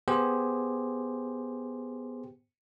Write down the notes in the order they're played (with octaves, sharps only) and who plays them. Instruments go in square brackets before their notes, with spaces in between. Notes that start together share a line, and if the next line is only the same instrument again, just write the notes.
[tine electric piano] B3 G4 G#4 C5